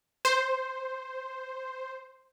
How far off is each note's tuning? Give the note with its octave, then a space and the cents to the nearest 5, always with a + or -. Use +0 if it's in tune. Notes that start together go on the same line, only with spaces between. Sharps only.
C5 +0